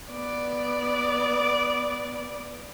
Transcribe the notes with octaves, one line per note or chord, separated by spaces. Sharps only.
B3 D5